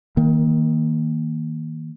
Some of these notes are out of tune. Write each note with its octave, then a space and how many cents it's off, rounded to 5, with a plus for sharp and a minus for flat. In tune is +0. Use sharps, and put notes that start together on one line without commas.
D#3 +25 A#3 +0